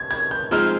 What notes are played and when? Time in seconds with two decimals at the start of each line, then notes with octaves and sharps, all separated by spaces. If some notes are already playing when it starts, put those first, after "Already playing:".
Already playing: G#6
0.11 G#6
0.31 G6
0.51 F3 G#3 C4 D#4 F6